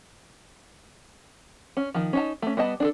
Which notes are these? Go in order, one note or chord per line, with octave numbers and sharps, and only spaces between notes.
C#4
D#3 F3
C#4 D#4 A5
A3 C#4
G3 B3 D#5 A5
D4 G#4 A4